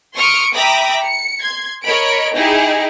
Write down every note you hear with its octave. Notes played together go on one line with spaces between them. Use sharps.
C6 C#6 D#6 F6 C#7 D7
E5 G5 A#5 B5 D6 D#6
C#7
C6 G#6
A#4 C#5 D#5 B5 D7
D#4 E4 G4 G#4